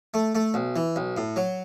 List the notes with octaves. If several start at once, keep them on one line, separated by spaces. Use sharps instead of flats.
A3
A3
B1
E3
B1
A2
F#3